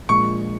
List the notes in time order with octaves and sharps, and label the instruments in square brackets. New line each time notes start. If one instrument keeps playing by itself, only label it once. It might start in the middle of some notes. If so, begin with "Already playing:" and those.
[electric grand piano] A#1 A#2 G#3 [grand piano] C#6